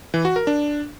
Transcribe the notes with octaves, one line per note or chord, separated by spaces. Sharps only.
E3
F#4
A#4
D4